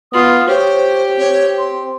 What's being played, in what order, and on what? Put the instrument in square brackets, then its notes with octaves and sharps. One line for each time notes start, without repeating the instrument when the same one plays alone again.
[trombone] B3 [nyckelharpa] F4 [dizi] D#6
[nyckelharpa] G4 [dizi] C5 [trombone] C#5
[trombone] C4 [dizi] C#5
[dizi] C6